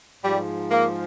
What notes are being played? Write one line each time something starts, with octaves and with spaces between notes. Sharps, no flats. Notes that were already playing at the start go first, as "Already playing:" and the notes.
G#2 F3 G3
A#3